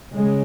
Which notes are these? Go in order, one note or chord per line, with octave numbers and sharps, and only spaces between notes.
C#3 G#3